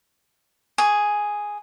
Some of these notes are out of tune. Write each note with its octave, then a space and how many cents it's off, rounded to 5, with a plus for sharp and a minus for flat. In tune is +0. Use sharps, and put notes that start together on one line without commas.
G#4 +0 C#6 +20